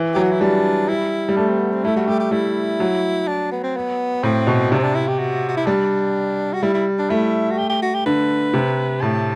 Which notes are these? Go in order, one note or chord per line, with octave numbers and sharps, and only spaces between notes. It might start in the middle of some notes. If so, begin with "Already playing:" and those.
Already playing: E3
F#3 G4
F#4
E4
G3 D4
E4
G3
A3 D4
C4
B3
C4
A3 E4
G3 F#4
A3 G4
G4
G3 E4
F#3
D4
B3
C4
B3
A2 C4
B2
C3 D4
C4
D4
E4
G4
F#4
F#4
E4
G3 D4
F#4
G3 E4
E4
D4
A3 E4
F#4
G4
G4
F#4
G4
D3 B4
C3
A2 A5